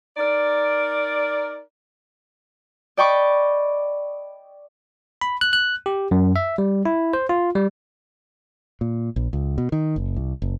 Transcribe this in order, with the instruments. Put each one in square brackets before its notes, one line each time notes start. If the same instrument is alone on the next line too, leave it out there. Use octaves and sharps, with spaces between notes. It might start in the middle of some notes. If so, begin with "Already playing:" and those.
[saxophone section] D#4 A#4 D5
[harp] D5 D#5 G5 B5 C#6 D6
[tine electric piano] B5
F#6
F#6
G4
F#2
E5
G3
E4
C5
F4
G3
[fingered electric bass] A#2
A#1
C#2
B2
D#3
F#1
C2
F#1